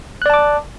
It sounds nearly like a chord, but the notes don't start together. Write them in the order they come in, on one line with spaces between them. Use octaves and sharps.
F#6 D5 A5 D6